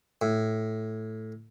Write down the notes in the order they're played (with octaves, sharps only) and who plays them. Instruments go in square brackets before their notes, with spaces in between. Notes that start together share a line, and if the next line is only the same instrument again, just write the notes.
[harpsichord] A2